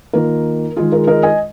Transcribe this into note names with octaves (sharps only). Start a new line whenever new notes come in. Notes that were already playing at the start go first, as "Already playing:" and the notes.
D#3 A#3 F4 A#4
D#3 G#3 F4 G#4
A#4
A#4 D#5
D#5 G#5